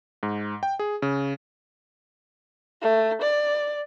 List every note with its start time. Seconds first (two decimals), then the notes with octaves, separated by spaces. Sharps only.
0.23 G#2
0.63 G5
0.79 G#4
1.02 C#3
2.82 A3
3.22 D5